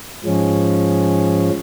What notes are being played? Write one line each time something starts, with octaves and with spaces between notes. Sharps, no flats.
G#2 F3 G#3 C#4